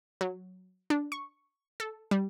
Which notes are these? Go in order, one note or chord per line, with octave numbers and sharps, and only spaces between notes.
F#3
D4
C#6
A4
G3